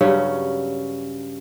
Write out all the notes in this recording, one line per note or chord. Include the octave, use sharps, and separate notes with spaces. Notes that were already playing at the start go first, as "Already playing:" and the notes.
G2 C#3 F#3 C#4